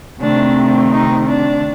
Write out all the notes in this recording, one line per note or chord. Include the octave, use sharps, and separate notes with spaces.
C3 D#3 A3 C4 D4
D#4
D4